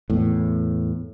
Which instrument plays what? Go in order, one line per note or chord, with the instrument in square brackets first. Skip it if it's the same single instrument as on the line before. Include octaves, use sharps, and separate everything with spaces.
[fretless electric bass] E2 A2